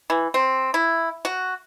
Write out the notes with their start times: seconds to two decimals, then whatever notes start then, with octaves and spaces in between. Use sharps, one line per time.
0.10 E3
0.34 C4
0.74 E4
1.25 F#4